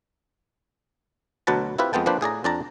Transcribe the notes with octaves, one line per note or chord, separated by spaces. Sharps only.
D2 B2 F#3 B4 A5 A#5
C4 E4 F4 G4 B4
F2 G#3 B3 G5 A5
F3 A#3 C4 D4 B4 C5
A2 G#4 D5 A#5
F2 D4 D5 G5 A5 A#5